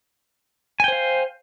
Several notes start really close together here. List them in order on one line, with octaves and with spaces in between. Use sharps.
G#5 G5 C5 F5